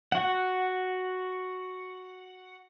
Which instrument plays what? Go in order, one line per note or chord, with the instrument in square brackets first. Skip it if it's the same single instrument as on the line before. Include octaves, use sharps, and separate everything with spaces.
[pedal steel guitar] F#4 F#5